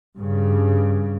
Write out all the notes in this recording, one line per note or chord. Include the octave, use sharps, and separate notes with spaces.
G2 C#3